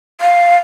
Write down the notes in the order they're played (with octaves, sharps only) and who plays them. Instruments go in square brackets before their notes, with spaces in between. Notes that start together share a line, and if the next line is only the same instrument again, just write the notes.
[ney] F5